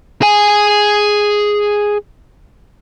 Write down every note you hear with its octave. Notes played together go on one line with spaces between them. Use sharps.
G#4 G#5